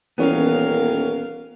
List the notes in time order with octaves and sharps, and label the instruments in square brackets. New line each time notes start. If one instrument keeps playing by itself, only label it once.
[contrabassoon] D#1 [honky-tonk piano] E3 C#4 [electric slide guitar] B3 [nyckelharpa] A#4 F5